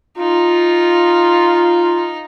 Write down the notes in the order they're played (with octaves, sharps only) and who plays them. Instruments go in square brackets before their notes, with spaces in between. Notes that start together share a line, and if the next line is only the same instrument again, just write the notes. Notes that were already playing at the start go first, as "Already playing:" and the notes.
[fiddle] D#4 [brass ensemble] F4